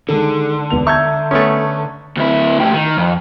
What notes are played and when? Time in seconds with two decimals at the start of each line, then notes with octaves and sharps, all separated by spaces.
0.09 D3 D#3 G#3 A4
0.70 E1 B3 F7
0.87 E5 A#5 C#6 E6 G6 G#6
1.31 A3 B3 C#4 C#6 D#6
2.17 D2 E4
2.60 A2 G4
2.74 D#3
2.98 F2